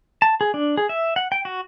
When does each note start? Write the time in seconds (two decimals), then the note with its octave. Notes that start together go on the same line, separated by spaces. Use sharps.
0.22 A5
0.41 G#4
0.54 D4
0.77 G#4
0.89 E5
1.16 F#5
1.32 G5
1.45 F#4